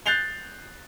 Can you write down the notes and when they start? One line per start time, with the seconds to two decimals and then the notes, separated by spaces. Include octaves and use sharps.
0.06 F#6 G6 A6 C7 F7 G7